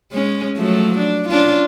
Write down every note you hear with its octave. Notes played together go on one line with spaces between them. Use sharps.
G#3 C#4
F3 F#3 A3
D4
C#4 D4 F4